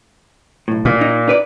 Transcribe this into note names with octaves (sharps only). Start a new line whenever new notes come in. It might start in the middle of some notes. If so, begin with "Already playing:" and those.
B1 A2
A#2
D#4
D#4 B4 D5